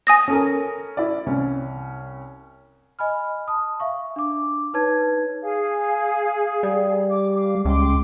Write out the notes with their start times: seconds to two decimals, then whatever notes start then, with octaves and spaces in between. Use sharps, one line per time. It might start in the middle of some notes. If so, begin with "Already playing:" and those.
0.07 G#5 D#6 A#6
0.28 C#4 A4 A#4
0.97 E4 D5
1.26 C2 C#4
2.99 D#5 G#5 B5 F6
3.48 A5 D#6
3.80 E5 F5 C#6
4.16 D4 D6
4.74 D#4 B4 C#5 A5 G#6
5.42 G#4 F5
6.63 G3
7.10 D6
7.35 F5 D6
7.65 C#2 G5 C6 D6